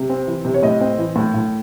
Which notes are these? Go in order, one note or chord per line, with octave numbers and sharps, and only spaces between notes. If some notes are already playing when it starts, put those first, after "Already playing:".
Already playing: C3
C4
E3
C3
C#5
A2 D#5
C4
E3
A2
A2